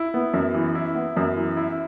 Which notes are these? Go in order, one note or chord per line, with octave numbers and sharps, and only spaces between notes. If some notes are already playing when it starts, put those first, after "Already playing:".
Already playing: E4
B3
F#2
E3
E4
B3
F#2
E3
E4